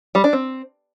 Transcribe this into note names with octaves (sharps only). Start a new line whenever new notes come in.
G3
D4
C4